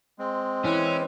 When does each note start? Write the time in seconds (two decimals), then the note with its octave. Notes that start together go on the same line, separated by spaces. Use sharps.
0.19 G#3 C4
0.65 E3 C#4